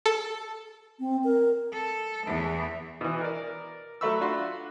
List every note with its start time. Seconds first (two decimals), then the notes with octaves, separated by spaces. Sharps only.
0.06 A4
0.99 C4
1.24 A#4
1.73 A4
2.27 E2 E3
3.01 B2 E3
3.21 A#4 D5
4.01 F#3 A3 E5 B5 C#6 E6
4.21 D4 F4 F#4 B5 C6